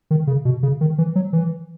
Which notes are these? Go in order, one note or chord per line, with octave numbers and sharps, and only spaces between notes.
D#3
C#3
B2
C#3
D#3
E3
F#3
E3